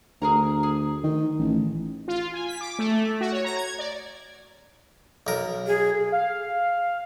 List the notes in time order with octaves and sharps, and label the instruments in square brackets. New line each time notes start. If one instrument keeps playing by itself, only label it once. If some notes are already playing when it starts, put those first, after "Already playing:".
[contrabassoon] D2 [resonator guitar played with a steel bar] G#4 A#4 A#5
[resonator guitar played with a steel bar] G#4
[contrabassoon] D#3
A1
[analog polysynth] F4
G#5
B6
D6
A3
F#4
C#5
A#5
G#6
D5
[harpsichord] B1 A#4
[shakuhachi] G#4
[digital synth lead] F5